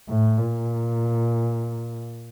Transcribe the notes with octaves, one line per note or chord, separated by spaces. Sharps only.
A2
A#2